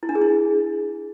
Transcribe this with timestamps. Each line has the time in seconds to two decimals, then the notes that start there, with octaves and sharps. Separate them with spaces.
0.03 E4
0.09 D4
0.15 G#4
0.22 E4